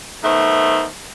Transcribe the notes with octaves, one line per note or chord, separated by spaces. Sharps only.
D#3 A3 B3 C5